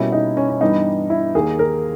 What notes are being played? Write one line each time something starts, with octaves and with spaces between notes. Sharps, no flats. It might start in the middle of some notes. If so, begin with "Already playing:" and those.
Already playing: B2 G3 A#3 C#4 E4
D#4
C#4
C#4
G2 E3 G3 B3 D#4
E4
D#2 D#3 A#3 G#4
A#4